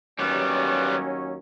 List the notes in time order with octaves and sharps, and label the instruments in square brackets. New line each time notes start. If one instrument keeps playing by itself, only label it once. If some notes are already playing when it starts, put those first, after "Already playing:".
[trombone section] D#2 F#3 C#4 [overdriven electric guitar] G3 B3